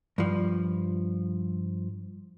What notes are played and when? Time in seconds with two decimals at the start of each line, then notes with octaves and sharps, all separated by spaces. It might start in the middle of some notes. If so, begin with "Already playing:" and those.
0.18 G2 F3